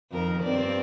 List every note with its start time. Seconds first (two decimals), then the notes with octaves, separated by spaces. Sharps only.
0.11 F2 D#3 A#4
0.43 G2 C4 D5